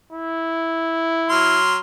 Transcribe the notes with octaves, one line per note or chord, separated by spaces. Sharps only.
E4
F#3 C6 F6